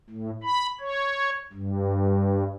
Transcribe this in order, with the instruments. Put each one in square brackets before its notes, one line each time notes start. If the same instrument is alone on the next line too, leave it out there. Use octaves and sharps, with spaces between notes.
[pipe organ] A2
B5
C#5
G2